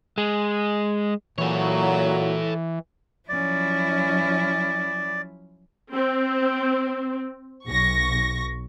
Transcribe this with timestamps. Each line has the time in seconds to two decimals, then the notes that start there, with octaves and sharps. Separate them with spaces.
0.18 G#3
1.38 A#2 E3 F#3 A4 C#5
3.29 F3 F#3 C#4 E4 D5
5.93 C4
7.66 B1 C#6 A#6